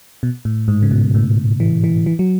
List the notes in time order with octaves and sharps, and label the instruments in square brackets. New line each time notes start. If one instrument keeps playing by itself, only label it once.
[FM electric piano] B2
A2
G#2
C#3
B2
A2
E3
E3
E3
F#3